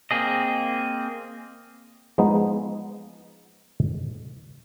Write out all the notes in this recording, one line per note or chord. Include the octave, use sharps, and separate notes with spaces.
A#3 C4 G#4 D#5
F3 G#3 B3 D#4